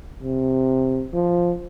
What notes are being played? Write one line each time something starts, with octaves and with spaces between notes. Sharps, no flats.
C3
F3